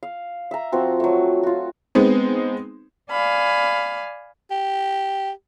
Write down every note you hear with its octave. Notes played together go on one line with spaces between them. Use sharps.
F5
E5 A#5
F3 C4 F#4
F#3 A3
F4 F#4
G#3 B3 C4 D#4
D5 F5 G#5 B5
G4